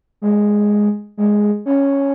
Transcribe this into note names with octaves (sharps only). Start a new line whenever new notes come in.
G#3
G#3
C#4